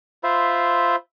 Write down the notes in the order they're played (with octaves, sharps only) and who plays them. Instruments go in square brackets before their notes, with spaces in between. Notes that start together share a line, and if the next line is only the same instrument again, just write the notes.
[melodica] F4 C5 E5 B5